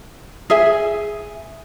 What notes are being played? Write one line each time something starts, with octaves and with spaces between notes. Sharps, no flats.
G#4 E5 G#5